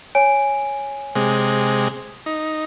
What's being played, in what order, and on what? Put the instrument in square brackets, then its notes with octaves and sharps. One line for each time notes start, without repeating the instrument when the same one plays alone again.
[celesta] C#5 G#5 D7
[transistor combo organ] C3 G#3
D#4